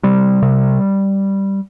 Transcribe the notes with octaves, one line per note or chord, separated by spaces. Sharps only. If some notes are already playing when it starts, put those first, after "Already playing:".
C3 G3
C3